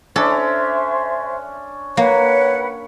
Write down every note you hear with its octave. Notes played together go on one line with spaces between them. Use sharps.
C#4 D4 A4 C5 E5
A#3 B4 C#5 F#5